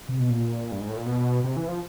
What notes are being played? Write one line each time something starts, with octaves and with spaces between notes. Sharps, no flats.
C3
B2
A#2
G2
G#2
A2
A#2
B2
C3
E3
F3